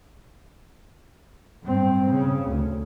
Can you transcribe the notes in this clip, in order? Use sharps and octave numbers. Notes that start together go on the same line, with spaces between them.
G2 C4
C#3
D2